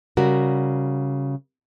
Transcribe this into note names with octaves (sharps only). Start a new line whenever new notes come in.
C#3 G3 F#4 A#4